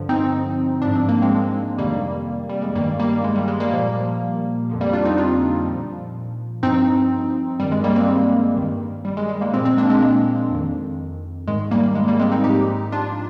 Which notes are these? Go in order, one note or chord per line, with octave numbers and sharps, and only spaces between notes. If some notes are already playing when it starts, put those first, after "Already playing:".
Already playing: G2 D3 F3
C4 D#4
G#2 F3 D4
C4
A#3
G#3 C4
F2 C3 D#3 G3 A#3
G3
G#3
G2 D#3 G3 A#3
G3 A#3
G#3
G3
G#3
G3 A#3
A#2 F3
F2 D3 F3
G3 A#3
D4 F4
C4 D#4
D4 F4
A#2 F3
G2 F3 C4 D#4
G2 D#3 G3
G#3
G3 A#3
G#3 C4
G2 D#3
G3
G#3
G#3
G3 A#3
A#2 F3 G#3 C4
G#3 C4
A#3 D4
G#3 C4
G#3
F2 D#3
G#2 D#3 G#3
G3 A#3
G#3
G3 A#3
G#3 C4
C4 D#4
G#2 F3 D#4 G4
D4 F4